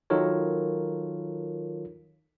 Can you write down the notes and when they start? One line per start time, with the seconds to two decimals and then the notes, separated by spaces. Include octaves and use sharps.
0.10 D#3 F#3 F4 A4 A#4 C#5